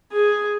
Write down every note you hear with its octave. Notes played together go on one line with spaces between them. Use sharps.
G#4